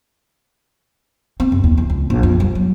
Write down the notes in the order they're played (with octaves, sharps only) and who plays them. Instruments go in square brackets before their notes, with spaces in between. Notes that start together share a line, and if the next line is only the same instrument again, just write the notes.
[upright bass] C4
F#2
D#2
E3
C#2
A#1
F2
G3
F#3